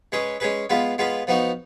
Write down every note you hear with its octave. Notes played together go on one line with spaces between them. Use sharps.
G#3 C#4 G#4 B4
G#3 C#4 G#4 B4
G#3 B3 F4 B4
G#3 B3 F4 B4
F3 B3 D#4 F#4